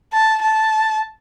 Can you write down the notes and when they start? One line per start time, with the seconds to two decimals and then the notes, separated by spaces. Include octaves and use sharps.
0.13 A5
0.42 A5